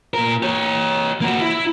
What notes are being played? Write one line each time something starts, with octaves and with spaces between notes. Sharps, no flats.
A#2 A#4
G4 C#5
A#3 F#4
E4